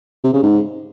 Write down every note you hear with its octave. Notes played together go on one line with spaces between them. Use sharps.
C3
C#3
G#2